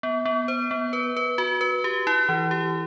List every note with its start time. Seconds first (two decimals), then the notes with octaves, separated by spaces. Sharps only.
0.03 B3
0.25 B3
0.48 C5
0.71 B3
0.93 B4
1.17 B4
1.38 F#4
1.61 B4
1.84 G4
2.07 E4
2.29 E3
2.51 G4